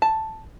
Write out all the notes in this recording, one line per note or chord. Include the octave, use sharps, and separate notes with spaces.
A5